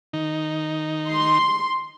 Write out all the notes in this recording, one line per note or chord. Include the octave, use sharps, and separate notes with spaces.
D#3 D#4
C6